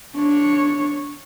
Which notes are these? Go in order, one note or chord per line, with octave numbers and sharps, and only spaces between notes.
D4 C#5